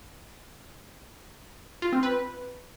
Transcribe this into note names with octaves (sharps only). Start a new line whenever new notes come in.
F4
C4
B4